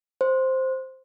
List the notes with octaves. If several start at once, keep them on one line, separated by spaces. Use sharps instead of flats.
C5